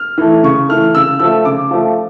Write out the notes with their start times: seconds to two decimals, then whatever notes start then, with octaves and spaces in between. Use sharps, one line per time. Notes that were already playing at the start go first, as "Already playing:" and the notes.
Already playing: F6
0.18 E3 A3
0.43 C#3 C#6
0.69 E3 A3 F6
0.95 C#3 E6
1.19 F3 A3 E6
1.45 C#3 D6
1.71 F3 A3